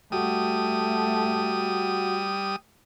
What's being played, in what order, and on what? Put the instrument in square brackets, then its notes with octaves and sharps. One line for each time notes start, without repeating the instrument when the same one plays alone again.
[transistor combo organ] G3 D#6 [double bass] A3 [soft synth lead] F#4